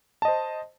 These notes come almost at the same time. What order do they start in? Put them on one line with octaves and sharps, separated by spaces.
A5 D#5 C5